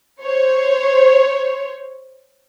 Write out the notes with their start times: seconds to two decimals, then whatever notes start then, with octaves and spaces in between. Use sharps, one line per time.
0.21 C5 C#5